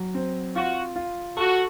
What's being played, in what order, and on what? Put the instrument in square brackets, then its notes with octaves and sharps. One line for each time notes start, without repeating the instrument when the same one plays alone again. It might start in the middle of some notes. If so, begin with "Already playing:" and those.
Already playing: [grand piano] F#3
C4
[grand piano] F4 [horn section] F#4
[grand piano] F4
[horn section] F#4 [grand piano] A4